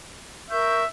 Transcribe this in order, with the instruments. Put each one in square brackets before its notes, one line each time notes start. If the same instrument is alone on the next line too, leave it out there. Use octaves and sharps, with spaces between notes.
[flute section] A#4 C#6 G6 [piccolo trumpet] E5